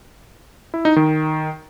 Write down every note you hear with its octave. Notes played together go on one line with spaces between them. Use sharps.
E4
D#4
D#3